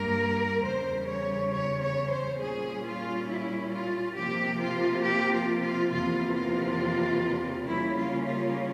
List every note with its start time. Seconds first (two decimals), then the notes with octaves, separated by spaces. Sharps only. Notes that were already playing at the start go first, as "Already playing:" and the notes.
Already playing: G2 G3 A#3 A#4
0.64 E2 C#3 G3 C5
1.08 C#5
1.52 C#5
1.81 C#5
2.11 C5
2.40 A#2 G3 C#4 G#4
2.84 F4
3.28 E4
3.72 F4
4.16 C3 F3 A#3 G4
4.60 F4
5.04 G4
5.33 F4
5.63 F4
5.91 E2 C3 F3 A#3 F4
6.35 F4
7.67 C#3 G3 A#3 C#4 E4
7.97 F4
8.26 F4